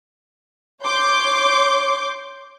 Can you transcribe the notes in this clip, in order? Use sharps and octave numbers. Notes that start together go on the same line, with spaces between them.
C#5 C6 D6 G6